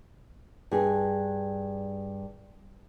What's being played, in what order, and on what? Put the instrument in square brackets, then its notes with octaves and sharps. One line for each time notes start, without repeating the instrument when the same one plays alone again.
[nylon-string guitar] G2 G#4